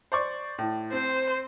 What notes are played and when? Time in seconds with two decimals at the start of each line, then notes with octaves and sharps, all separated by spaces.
0.12 C5 D5 C#6
0.59 A2
0.93 C4 C5